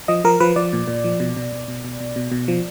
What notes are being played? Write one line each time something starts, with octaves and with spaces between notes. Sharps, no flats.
F3 D#5
F3 A#4
F3 B4
F3 D5
A#2
A#2
F3
B2
B2
B2
B2
B2
B2
B2
B2
F3